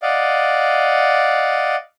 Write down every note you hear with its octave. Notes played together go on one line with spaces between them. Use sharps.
D5 D#5 F5 F#5